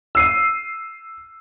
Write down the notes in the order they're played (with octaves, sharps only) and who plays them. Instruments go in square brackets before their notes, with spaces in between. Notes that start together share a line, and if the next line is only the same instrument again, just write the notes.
[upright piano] E6 C7 D#7